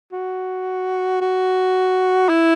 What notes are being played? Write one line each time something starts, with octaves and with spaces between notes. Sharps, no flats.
F#4
F#4
E4